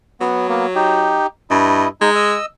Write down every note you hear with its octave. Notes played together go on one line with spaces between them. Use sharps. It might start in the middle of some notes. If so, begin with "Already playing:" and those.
F#3 B3
A#3 B3
D#4 G4
G2 E4 D#5
G#3 D#4
D#5 E6